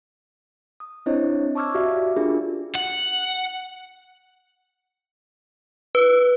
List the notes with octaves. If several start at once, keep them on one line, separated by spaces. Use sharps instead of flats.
D#6
C4 D4 E4 C5 C#5 D#5
A5 C#6 D6 E6 F6 G#6
F#4 G4 D5 E5 F5
D4 F4 G4 G#4 A#4
F#5
B4